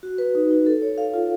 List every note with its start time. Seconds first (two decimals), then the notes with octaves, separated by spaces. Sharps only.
0.03 F#4
0.18 B4
0.35 D#4
0.51 D#4
0.66 A4
0.82 C#5
0.98 F5
1.14 F4